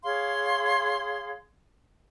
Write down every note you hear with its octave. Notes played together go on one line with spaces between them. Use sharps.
G#4 C#5 F5 C6